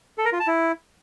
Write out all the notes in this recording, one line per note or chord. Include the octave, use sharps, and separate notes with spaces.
A4
A#4
F4
A5
E4